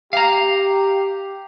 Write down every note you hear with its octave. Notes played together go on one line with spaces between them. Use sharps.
G4 F5 A#5